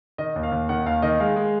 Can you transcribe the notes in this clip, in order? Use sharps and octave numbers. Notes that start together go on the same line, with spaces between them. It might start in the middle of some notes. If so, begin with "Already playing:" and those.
D#3 D#5
D#2
F5
D#2
D#3 F#5
D#2 F5
D#3 D#5
G#3 F5
G#3